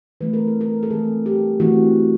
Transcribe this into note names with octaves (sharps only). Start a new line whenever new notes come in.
E3 A3 C4 B4
A#4
A4
A#4
A4
E3 A3 C4 G#4
G4
E3 A3 C4 F#4